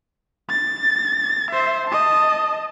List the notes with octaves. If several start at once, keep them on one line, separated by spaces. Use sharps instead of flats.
A6
C5 E5
D#5 A5